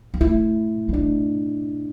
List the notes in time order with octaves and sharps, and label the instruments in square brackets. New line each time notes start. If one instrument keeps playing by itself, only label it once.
[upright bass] G3
[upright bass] A3 [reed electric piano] E4
[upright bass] G3
[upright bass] A3 [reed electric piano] D4